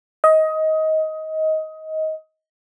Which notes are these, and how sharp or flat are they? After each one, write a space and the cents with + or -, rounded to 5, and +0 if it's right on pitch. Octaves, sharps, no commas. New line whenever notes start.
D#5 +20